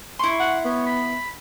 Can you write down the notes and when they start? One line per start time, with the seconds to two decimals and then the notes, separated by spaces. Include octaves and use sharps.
0.19 E4 C6 C#6
0.40 F#5
0.65 B3 C#5
0.86 B5